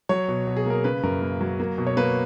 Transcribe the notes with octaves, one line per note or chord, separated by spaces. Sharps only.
F#3 C#5
B2
B2
G#4
A#3 A#4
C#3 B4
F#2 A#4
A#3
F#3
A#3
B2
C#5
A#3 B4